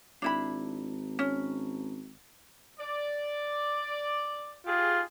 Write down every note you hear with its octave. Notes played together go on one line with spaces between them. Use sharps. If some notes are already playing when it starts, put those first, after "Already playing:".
G#1 D4 E4 B5
C#4
D5
D#4 F4 G4 G#4